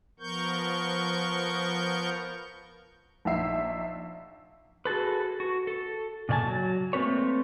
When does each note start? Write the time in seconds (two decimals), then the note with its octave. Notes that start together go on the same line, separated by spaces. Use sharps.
0.20 F3 B3 A#4 C#6 G6
3.25 A#1 D#4 E5 C7
4.85 F#4 G#4 A4 B4
5.40 F#4
5.67 A4
6.29 A#2 C#3 D5 G#5 A5
6.45 F#3
6.93 A3 A#3 C4 B4 C#5